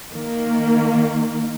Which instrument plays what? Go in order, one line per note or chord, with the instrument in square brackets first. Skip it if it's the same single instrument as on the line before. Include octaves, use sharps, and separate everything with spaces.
[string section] D#3 A#3